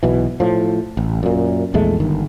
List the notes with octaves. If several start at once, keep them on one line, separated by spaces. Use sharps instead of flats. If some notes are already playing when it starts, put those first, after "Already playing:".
B1 B2 E3
A2 F3
A1
F#2 A#2
A#1 E2 G#3 A3
G1 D#3